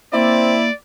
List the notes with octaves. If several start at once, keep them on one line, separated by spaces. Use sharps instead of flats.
A#3 C4 E4 D5